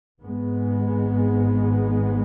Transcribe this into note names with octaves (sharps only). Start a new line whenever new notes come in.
G#1 G#2 G#3 B3